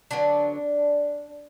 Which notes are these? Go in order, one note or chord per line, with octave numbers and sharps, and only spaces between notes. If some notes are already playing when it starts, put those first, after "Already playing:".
D3 F#3 B3 D4